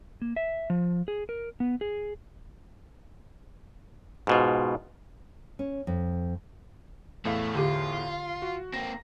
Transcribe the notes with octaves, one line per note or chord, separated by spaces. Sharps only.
A#3
E5
F3
G#4
A#4
B3
G#4
G#2 B2 F4
C#4
F2
E2 A2 A3 F5
D3 F4 G4
F#4
A#3 C4 A#6